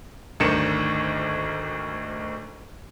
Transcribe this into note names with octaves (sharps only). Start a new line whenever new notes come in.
G#1 D2 D#3 D4 C#7 E7